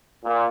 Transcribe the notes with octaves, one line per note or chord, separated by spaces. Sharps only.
A#2